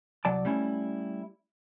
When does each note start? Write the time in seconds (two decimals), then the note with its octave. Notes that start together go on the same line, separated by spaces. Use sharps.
0.25 C2 F#3 D5 A5
0.45 G3 A3 C#4 E4